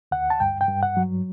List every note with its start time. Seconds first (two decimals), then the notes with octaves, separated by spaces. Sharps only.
0.12 D2 F#5
0.30 A5
0.40 G2 G5
0.61 G5
0.68 G2
0.83 F#5
0.97 F#3